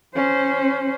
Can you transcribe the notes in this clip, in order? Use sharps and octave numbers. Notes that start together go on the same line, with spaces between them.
C#4 C5